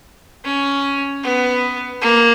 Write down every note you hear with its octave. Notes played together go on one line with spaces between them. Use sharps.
C#4
B3
A#3